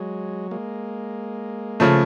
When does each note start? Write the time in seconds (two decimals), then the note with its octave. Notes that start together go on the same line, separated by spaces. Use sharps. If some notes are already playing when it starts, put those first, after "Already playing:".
Already playing: F#3 G#3
0.51 G#3 A#3
1.80 C#3 F3 A3